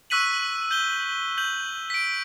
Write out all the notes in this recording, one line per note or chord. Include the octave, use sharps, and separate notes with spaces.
C#6 E6 F#6 B6 D#7 F#7
G6 G7
G6 F#7
B6 D7